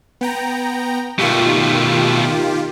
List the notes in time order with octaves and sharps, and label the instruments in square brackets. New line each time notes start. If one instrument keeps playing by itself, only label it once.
[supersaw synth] B3 G5 A#5
[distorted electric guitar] B2 A3 [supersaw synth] D#3 F4 G4